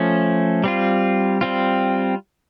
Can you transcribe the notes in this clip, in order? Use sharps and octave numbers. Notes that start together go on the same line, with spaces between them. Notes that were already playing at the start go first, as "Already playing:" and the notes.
Already playing: F3 A3 C#4
G3 C4 F4
G3 C4 F4